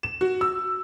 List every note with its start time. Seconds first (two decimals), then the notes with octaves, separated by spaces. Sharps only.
0.03 E7
0.21 F#4
0.41 E6